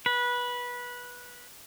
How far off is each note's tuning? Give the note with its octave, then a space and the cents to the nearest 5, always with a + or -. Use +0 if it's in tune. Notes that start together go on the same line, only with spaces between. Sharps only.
B4 -15